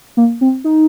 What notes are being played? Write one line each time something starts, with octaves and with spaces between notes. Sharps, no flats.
A#3
C4
D#4